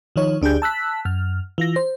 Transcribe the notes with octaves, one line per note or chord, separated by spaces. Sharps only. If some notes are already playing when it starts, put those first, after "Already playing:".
D#3 F3 D#4 C#5
D2 D4 G4 G#4 G6
A5 E6 F#6 B6
F#2 F6
E3 F4 A#6
C5